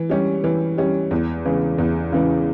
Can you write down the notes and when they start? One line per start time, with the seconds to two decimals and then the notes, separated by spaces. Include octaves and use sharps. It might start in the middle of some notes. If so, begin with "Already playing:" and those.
Already playing: E3
0.10 G3 C#4 G4
0.44 E3
0.78 G3 C#4 G4
1.11 E2
1.45 C#3 E3
1.78 E2
2.12 C#3 E3